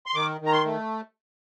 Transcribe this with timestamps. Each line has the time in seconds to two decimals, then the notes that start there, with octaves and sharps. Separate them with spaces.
0.06 C6
0.15 D#3 D6
0.41 D#3
0.46 A#5
0.52 C6
0.65 A3